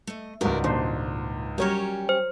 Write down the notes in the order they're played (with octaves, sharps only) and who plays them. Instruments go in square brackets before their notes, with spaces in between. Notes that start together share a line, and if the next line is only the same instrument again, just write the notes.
[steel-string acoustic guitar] A3 D#5
[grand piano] C#2 G#2 [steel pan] G3 F#4 [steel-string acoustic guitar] A#4 B4 D5
[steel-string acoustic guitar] A#2 [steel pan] D#3 D4 C5
[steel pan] F#3 A#4 C#5 [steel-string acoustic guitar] G3 C#4 G4
[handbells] C5